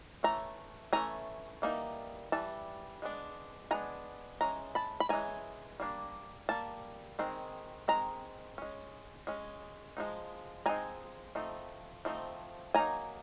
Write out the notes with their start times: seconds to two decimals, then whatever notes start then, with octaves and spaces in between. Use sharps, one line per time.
0.23 E3 A3 C#4 A#5
0.93 E3 A3 C#4 G#5 A#5
1.62 E3 G3 A#3 D#4
2.32 E3 G3 A5
3.02 G#3 B3 D4
3.71 G#3 B3 D4 G#5 A#5
4.41 E3 G#3 C#4 A#5
4.75 A5 B5
5.00 B5
5.09 E3 G#3 C#4 G#5 A#5
5.80 G3 A#3 D4
6.49 G3 A#3 A5
7.19 D#3 G#3 C4
7.88 D#3 G#3 C4 A#5
8.58 G#3 C#4
9.27 G#3 C#4
9.97 F3 G#3 C4 D#4
10.66 F3 G#3 C4 D#4 G#5 A#5
11.35 F3 A3 C4 D#4
12.05 F3 A3 C4 D#4
12.75 F#3 A#3 D#4 G#5 A#5